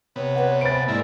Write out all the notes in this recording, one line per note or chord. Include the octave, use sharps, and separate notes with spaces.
C3 B3 C#5
G4 B4 D5 F#5
C5 E5 G#5 B5 A6 D7
G#2 A#3 E4 D5